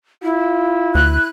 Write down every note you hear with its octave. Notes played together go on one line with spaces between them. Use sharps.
E4 F4
D2 F#6